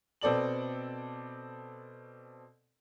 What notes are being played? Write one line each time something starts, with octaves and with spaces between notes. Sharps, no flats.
B2 C4 A4 D5 F#7